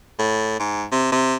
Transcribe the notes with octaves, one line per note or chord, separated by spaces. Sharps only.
A2
G#2
C3
C3